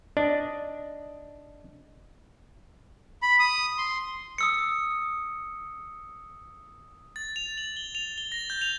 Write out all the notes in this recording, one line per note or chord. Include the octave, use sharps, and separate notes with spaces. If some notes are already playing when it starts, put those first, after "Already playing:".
D4 D#5
B5
D#6
C6
D#6 E6 C#7
A6
F7
F#7
G7
F7
G7
A#6
G6
F7